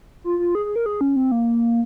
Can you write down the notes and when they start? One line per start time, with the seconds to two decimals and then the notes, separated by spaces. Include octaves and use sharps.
0.24 F4
0.39 F4
0.55 G#4
0.65 G#4
0.76 A#4
0.86 G#4
1.01 C#4
1.16 C4
1.32 A#3